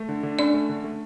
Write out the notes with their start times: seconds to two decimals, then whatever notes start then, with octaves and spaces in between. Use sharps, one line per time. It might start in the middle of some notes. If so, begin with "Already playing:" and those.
Already playing: A3
0.09 D3
0.23 D3
0.39 C#4 D4 D5
0.54 A3
0.69 D3
0.84 A3